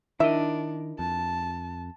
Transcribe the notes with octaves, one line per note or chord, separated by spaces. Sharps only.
D#3 D4 E4 A#4 D#5 E5
F2 A5